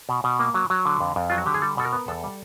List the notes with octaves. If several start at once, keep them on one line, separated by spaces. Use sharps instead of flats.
B2
B2
A#3
F#3
F#3
D3
F2
F2
F#3 F4
F#4
D3 G4
G#4
G3 A4
B2 A4
A#4
B3
E2 A4
G3